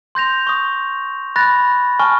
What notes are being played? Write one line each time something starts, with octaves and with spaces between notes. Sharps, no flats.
C6 G6 A#6 F7
C#6 D#6
B5 F#6 A6 A#6
G#5 A5 C#6 F6